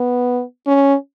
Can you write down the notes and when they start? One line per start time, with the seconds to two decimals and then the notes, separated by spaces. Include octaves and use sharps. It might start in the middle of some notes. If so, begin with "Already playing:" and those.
Already playing: B3
0.67 C#4